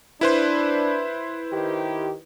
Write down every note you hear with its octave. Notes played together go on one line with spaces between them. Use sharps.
D4 E4 B4 C5
D#3 G4